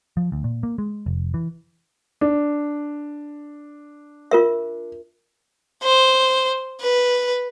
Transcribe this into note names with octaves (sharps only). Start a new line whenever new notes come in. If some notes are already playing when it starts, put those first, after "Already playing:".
F3
D2
A#2
A#3
G#3
F1
E3
D4
F4 A#4 E5
C5
B4